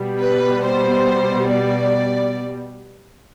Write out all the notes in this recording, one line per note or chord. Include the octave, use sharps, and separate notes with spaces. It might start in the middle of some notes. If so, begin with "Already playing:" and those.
Already playing: B2 G3
B4
C5
D5